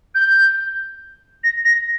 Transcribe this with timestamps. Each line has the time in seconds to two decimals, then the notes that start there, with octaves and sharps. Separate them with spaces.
0.15 G6
1.44 A#6
1.65 A#6